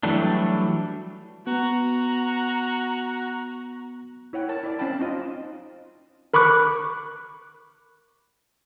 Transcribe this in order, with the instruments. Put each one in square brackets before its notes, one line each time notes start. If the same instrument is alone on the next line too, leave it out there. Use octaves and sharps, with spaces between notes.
[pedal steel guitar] E3 F#3 G3 A3 D4
[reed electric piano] B3 [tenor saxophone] F#4 [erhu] A#5
[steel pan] E4 C#5 F#5 G5
A#4 C#5 A5
E4 D5
C4 C#4 F5 G5 A5 B5
C4 D#4 F4 D#5
[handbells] A#4 B5 C#6 D6 F#6